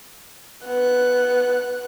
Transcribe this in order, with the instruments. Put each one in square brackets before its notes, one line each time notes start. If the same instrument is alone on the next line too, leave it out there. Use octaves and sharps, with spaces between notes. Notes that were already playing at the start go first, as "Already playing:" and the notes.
[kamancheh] B3 F#6